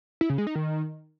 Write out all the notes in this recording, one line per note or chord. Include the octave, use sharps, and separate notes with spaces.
E4
C#3
G#3
D#4
D#3